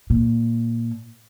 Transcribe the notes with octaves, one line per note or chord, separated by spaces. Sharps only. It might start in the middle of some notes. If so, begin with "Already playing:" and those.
A#2